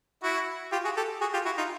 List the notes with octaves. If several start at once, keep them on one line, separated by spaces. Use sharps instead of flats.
E4 F#4
F4 G4
F#4 G#4
G4 A4
F#4 G#4
F4 G4
E4 F#4
D#4 F4